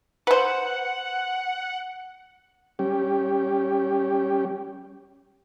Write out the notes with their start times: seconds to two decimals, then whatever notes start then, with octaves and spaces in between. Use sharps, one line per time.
0.27 B4 C5 F#5
2.79 G3 C#4 G4